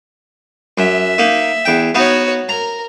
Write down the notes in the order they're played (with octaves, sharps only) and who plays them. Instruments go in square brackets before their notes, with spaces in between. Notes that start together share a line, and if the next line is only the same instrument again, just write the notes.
[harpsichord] F#2 [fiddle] E5
[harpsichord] A#3 D#4
E2 G5
[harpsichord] B3 D#4 [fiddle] F#4 C#5
[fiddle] A#4 [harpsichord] A#5